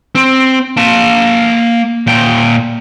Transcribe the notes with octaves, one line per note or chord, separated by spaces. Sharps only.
C4
A#3 A5
A#2 G5